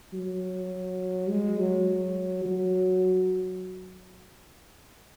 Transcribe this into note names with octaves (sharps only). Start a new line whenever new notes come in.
F#3
G#3
F#3
F#3